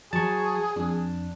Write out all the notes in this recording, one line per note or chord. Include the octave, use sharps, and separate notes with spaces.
F#3 G#4 A5 C#6
F2 D4